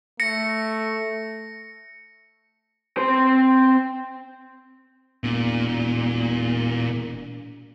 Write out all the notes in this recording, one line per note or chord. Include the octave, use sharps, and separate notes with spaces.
A3 A#6 C#7
C4 C5
E1 A#2